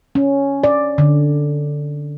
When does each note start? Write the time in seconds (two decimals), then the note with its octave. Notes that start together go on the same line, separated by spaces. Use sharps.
0.15 C#4
0.64 D5
0.98 D3